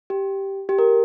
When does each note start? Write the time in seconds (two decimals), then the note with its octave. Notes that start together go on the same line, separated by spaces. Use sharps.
0.10 G4
0.69 G4
0.79 A#4